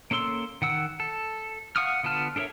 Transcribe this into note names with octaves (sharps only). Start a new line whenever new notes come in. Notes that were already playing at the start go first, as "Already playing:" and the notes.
A#3 C#4 A4 C6 E6
D#3 F#5 E6
A4
F5 F#5 C#6 D#6 F6
D3 B3 F4 A5 F6
D4 A4 A#4 C#5 E5